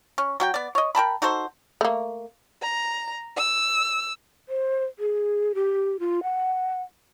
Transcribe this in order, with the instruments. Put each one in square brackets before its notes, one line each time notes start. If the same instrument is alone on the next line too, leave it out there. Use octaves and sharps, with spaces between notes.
[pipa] C#4
F#3 F#4 G5
B3 D5
C#5 D#5
A#4 G5 A5 B5
D#4 F#4 A4 C5
[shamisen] A3 A#3
[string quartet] A#5
E6
[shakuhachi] C5
G#4
G4
F4
F#5